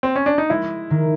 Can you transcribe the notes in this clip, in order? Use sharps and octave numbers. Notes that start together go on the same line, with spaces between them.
C4
C#4
D4
D#4
G#3 E4
D#3